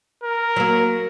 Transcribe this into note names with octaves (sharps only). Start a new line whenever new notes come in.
A#4
F#3 A#3